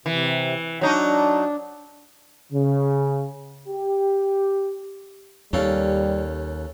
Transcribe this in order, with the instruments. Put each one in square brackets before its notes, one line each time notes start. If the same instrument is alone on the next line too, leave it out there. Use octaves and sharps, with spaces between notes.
[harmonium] C3 [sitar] E3
[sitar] F#3 D#4 [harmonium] D4
[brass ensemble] C#3
G4
[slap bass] D#2 [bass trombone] G3 [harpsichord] C#4 A4 F5